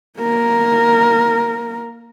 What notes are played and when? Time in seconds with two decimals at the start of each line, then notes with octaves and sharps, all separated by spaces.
0.19 A#3 A#4